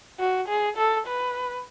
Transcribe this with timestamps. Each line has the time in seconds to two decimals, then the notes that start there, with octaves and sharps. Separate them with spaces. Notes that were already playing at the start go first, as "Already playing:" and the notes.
0.20 F#4
0.49 G#4
0.77 A4
1.07 B4